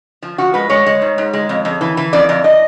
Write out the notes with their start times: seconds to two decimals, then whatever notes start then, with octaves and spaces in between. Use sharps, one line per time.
0.22 F3
0.38 F3 F#4
0.54 G#3 B4
0.69 G#3 C#5
0.86 G#3
1.02 G#2
1.18 G#2
1.33 G#3
1.49 F2
1.65 F2
1.81 E3
1.97 E3
2.13 F2 D5
2.29 F2
2.44 D#5